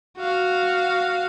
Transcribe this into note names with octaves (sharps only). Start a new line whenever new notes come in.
F#4 F5